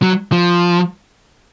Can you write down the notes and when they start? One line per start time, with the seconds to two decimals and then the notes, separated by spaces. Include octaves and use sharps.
0.02 F#3
0.32 F3